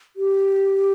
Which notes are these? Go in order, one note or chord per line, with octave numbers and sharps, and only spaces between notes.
G4